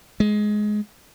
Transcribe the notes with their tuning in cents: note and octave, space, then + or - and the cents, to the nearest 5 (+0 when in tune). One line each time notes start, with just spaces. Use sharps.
G#3 +15